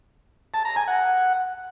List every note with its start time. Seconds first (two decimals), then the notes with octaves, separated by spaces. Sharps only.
0.54 A5
0.65 A#5
0.76 G#5
0.88 F#5